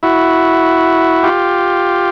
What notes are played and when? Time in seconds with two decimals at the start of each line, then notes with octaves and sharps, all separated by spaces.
0.03 E4 F#4
1.23 F4 G4